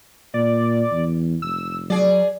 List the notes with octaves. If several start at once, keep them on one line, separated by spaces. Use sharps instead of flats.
A#2 D5
E2
F1 E6
F#3 G#4 D5